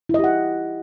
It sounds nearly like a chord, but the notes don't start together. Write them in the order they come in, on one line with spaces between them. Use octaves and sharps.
E4 D#5 G4 F#5